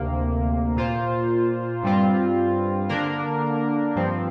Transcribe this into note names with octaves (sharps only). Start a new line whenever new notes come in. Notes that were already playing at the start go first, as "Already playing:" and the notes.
Already playing: D2 C3 A#3
A#2 A#3 F4 C5
G2 G3 C4 F4
D3 A#3 D4 A#4
G2 F3 C4